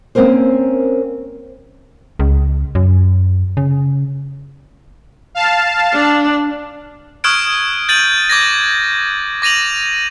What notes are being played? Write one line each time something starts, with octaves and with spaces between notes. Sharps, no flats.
A#3 C4 C#4 A#4 C5
C#2
F#2
C#3
F5 A5
D4
C#6 D#6 F6 F#6 G#6 D7
G6 A6 D#7 F#7
D6 G#6 A#6
D6 A#6 D#7 F7 F#7